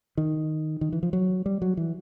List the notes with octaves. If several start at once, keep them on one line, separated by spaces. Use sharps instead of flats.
D#3
D#3
E3
F3
F#3
G3
F#3
E3